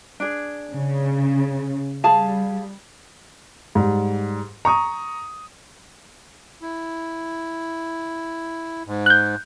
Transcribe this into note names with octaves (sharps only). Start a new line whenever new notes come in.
D4 G#4
C#3
G3 G#4 F5 A5
G#2 G3
A#5 C#6 D#6
E4
G#2
F#6 G6